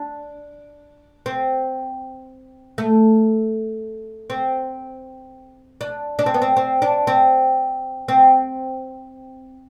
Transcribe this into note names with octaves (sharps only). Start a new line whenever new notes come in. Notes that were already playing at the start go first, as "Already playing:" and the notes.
Already playing: D4
C4
A3
C4
D4
D4
C4
B3
C4
C4
D4
C4
C4